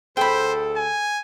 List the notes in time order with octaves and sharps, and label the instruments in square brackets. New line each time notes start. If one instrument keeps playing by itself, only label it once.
[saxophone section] D2 G#4 A4 [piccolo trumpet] C5 [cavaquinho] G5 B5
[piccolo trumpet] G#5